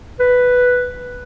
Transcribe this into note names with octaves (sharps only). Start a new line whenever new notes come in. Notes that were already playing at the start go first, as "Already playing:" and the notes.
B4